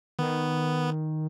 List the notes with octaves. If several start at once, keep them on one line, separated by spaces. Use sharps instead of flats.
D#3 B3